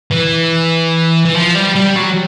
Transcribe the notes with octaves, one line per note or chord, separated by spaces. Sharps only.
E3
E3
F3
G3
G3
F#3